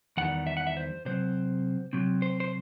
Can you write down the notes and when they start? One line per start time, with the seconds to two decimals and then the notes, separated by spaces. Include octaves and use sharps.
0.17 E2 D#3 G3 F#5
0.47 E5
0.57 F#5
0.67 E5
0.77 C5
1.05 C3 F#3 C4 C5
1.93 C3 F#3 C4
2.22 C5
2.40 C5